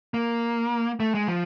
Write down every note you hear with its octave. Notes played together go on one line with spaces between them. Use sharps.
A#3
A3
G#3
F3